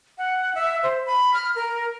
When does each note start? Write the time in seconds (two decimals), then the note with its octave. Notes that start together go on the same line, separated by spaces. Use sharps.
0.18 F#5
0.55 E5
0.83 C5
1.06 B5
1.34 F6
1.56 A#4